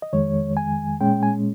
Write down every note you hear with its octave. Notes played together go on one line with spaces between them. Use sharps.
D#5
F2 D#3 G#3 C#5
G#5
A#2 G#3 C#4 G5
G#5